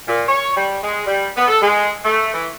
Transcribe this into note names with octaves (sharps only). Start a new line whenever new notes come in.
A#2
C#5
G3
G#3
G3
B3
A4
G#3
A3
E3